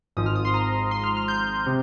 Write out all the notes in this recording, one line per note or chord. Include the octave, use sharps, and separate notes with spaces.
G#1 G#2 F3 D#6
F6
D#6
C6
A#5
C6
F6
F6
G6
C3